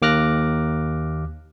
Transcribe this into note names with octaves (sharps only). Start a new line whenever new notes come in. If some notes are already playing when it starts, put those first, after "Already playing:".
D#2 A#3 D6 F6 F#6 A#6